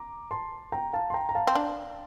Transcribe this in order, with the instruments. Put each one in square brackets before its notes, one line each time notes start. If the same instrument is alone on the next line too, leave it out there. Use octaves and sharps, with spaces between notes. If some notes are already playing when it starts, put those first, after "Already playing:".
Already playing: [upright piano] A#5 D6
A5 C6
G5 A#5
F5 A5
C6
G5 A#5
A#5
F5 A5
[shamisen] C4
D4